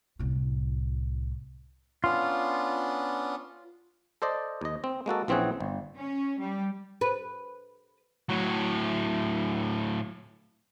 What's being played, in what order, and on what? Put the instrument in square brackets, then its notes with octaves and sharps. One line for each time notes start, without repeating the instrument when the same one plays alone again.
[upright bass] C2 A2
[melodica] B3 C#4 D4 [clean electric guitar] F4
[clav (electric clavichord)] A4 C5 D5 D#5
D#2 D#5
C4
G#3 A#3 F#4 A4
A#1 E3 C4 C#4 G#4 F#5
G1
[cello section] C#4
G3
[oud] B4
[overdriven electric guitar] A2 F#3